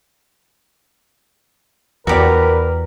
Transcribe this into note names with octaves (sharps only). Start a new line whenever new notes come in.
E2 F#4 G4 A#4 B4 D5